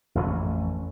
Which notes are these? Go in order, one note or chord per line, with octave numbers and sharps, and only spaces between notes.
A1 F2 A3 C#4